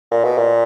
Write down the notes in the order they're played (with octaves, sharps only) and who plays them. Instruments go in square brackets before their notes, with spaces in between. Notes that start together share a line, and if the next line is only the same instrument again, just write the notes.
[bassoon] A#2
B2
A#2